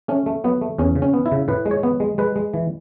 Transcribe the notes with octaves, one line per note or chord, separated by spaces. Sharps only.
A3 C#4
A3
F#3 B3
A3
E2 C#4
C#3
C#4
B3
E4
C#3
A2 B4
G#3
C#5
B3
G#3
G#3 B4
G#3
E3